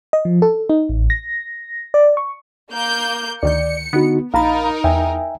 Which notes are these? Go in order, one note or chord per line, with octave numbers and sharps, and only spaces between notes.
D#5
F3
A4
D#4
A1
A#6
D5
C#6
A#3 G6
D2 D#3 D5 G6 C#7
D3 B3 D#4 F#4
A#1 D#4 A#4 F5 A#5 B5 A6
E2 E5 G5 G#5